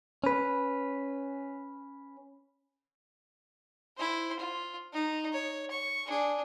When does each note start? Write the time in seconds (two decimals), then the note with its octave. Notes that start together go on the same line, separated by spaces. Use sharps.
0.24 C#4 B4
3.97 E4 C5
4.39 F4
4.93 D#4
5.32 C#5
5.71 C#6
6.06 D4 G#4